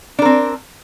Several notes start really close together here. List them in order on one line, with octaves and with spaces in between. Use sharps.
D4 A#4 C4